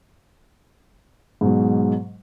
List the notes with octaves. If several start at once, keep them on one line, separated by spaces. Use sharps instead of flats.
G#2 B2 F#3